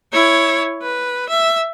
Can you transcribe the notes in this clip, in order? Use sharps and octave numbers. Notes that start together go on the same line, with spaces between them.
E4 C#5
B4
E5